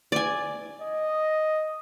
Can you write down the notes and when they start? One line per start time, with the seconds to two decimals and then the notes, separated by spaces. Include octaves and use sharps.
0.12 D5 G#5
0.82 D#5